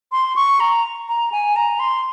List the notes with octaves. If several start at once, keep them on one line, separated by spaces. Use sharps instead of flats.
C6
C#6
A#5
A#5
G#5
A#5
C6